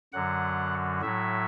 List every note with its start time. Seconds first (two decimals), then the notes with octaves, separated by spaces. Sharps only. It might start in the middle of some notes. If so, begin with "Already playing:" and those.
0.13 F#2 D3 F#3 F#5
1.02 A2 F#3 E5